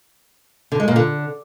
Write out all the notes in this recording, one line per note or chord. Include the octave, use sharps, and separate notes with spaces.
D3
G#3
A#2
D3